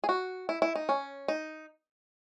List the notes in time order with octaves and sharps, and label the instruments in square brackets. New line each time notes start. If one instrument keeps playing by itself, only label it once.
[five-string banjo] G#4
F#4
E4
E4
D#4
C#4
D#4